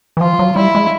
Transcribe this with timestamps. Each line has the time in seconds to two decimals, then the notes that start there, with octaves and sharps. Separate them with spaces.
0.17 E3
0.21 F3 F4
0.39 F#3
0.56 G3 E4
0.75 G#3